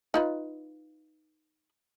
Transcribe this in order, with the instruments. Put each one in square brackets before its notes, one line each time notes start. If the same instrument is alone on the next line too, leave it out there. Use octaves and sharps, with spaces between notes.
[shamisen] D#4 F4 B4